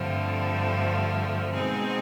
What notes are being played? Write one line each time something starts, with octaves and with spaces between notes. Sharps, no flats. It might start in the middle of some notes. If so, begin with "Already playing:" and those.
Already playing: G2 D3 F3 A3 C4
B2 G#3 C4 D#4 G#4